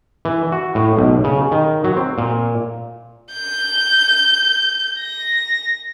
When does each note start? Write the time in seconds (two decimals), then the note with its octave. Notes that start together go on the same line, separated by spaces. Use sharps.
0.25 E3
0.52 F#4
0.75 A2
0.97 B1
1.24 C#3
1.51 D#3
1.84 F#3
1.96 C4
2.18 A#2
3.33 G6
5.00 A#6